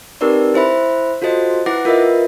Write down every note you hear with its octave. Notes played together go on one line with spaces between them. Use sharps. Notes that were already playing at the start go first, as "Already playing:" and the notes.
C4 D#4 G4 A#4 B4 D5
E4 C5 E5 B5
F4 F#4 A4 C5 D#5
E4 B4 F#5 D6 A#6
F4 A#4 B4 D#5 E5